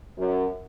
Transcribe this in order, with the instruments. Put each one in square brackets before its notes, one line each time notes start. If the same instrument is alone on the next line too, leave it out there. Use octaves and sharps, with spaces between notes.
[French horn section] F#2